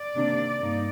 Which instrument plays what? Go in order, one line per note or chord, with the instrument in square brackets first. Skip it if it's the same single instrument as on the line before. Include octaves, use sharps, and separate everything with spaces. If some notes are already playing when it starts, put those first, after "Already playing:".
Already playing: [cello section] D5
C3 D#3 A#3 D4
G2 A#3 D#4